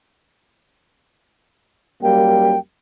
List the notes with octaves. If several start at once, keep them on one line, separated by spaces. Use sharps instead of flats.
F#2 G3 A#3 G5